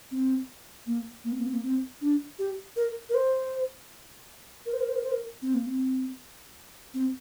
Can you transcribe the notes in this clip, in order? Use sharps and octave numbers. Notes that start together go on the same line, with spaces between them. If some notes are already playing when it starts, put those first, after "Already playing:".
C4
A#3
A#3
C4
A#3
C4
A#3
C4
D4
G4
A#4
A#4
C5
A#4
C5
A#4
C5
A#4
C5
A#4
C4
A#3
C4
C4